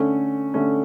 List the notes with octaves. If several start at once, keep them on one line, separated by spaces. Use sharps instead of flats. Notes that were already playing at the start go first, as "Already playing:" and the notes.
Already playing: D3 A3 C#4
D3 A3 C#4